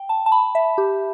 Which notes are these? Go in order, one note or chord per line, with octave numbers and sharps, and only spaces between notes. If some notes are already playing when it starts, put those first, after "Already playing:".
Already playing: G5
A5
A5
B5
E5
G4